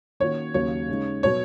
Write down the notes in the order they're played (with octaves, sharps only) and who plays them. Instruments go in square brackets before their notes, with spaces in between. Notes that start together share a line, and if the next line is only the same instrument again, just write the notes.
[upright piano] D#3 A#3 C#4 F#4 [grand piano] C#5
[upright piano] D#2 C#3 F#3 A#3 [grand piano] C#5
[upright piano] C#3 G#3 D#4
[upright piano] B2 F#3 [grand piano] C#5